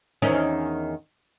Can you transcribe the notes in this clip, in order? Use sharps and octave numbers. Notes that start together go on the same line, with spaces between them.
E2 D#3 C#4